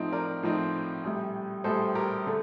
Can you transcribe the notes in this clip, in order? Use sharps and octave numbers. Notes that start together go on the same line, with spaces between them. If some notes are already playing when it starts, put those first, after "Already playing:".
Already playing: A2 F3 C4 D#4
A#4 D5
A2 F3 C4 D#4
A#1 A2 G3
A#1 A2 G3 A4 C5
G4 A#4
D3 A3